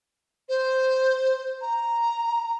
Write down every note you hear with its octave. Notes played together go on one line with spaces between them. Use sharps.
C5
A#5